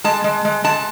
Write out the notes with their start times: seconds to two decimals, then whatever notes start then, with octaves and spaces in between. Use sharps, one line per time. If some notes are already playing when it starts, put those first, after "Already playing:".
0.04 G#3 A5
0.24 G#3
0.45 G#3
0.64 G#3 A5